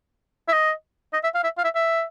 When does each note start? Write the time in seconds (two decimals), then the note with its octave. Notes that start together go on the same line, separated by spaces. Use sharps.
0.48 E5
0.53 D#5
1.13 D#5
1.24 E5
1.35 F5
1.44 E5
1.58 F5
1.64 E5
1.75 E5